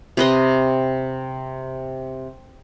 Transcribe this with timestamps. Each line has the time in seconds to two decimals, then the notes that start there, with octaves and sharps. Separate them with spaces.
0.17 C3 B4 D#5 C6